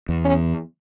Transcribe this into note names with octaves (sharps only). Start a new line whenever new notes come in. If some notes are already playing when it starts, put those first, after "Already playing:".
E2
C#4